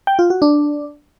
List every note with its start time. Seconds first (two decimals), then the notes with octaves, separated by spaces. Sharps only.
0.07 G5
0.19 F4
0.30 F#4
0.42 D4